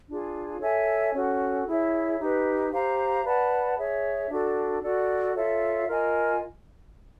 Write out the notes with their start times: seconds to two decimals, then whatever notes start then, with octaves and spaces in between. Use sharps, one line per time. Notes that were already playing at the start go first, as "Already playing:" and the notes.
0.08 D4 F4 G#4
0.61 A4 C#5 E5 G#5
1.13 C#4 F#4 A4
1.67 E4 G#4 C#5 E5
2.19 D#4 G4 B4
2.72 G4 C5 F5 A#5
3.24 B4 D5 F#5 A5
3.78 G#4 C#5 E5
4.30 D4 F#4 A4
4.82 F#4 A4 D5
5.35 F4 A4 C#5 E5
5.88 F4 A#4 D#5 G#5